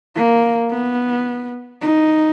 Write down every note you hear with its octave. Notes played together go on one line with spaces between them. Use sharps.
A#3
B3
D#4